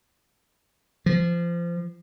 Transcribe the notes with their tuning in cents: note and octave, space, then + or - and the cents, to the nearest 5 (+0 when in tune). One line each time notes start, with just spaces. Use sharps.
F3 -25